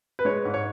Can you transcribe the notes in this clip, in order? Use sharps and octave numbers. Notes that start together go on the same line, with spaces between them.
B4
G#3 C#5
G#2
C#5